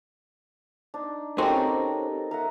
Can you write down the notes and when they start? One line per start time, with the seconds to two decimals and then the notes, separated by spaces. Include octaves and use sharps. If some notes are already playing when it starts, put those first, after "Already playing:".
0.94 D4 D#4
1.38 C4 C#4 D#4 F#4 G4 A4 A#4 D#5
2.31 A#4 E5 F#5